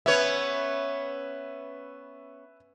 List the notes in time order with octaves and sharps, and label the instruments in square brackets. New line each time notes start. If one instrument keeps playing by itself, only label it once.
[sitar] B3 C#4 C#5 [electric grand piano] B4 E5